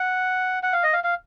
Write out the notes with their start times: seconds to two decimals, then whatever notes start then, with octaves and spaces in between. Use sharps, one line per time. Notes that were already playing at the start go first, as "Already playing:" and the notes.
Already playing: F#5
0.63 F#5
0.73 F5
0.83 D#5
0.93 F5
1.04 F5